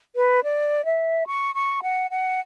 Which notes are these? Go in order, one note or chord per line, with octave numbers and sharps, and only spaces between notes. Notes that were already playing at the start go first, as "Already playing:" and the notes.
B4
D5
E5
C#6
C#6
F#5
F#5